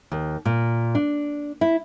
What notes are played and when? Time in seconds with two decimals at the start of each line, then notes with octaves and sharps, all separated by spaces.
0.11 D#2
0.45 A#2
0.95 D4
1.61 E4